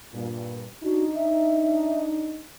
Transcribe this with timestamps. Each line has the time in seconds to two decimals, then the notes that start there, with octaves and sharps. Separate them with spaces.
0.14 G2 A#2
0.84 D4 D#4 F#4
1.15 E5